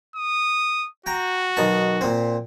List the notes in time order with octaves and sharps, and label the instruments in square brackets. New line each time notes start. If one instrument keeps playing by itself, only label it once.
[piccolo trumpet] D#6
[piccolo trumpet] F#4 [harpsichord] G5 A#5
[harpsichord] B1 D#3 A5
A#2 C4